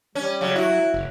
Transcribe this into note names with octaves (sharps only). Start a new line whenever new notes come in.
G3 C#4
C#3 F#3
E4 F#4
F#1